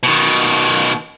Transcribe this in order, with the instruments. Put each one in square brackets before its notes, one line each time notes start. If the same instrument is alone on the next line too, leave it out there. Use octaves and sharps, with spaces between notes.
[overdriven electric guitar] B2 D#3